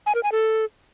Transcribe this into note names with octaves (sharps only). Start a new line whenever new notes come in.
G#5
A#4
G#5
A4